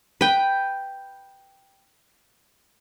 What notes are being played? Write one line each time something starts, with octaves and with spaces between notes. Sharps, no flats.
B4 G5